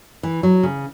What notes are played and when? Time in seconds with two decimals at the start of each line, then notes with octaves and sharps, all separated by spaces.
0.23 E3
0.43 F#3
0.63 C#3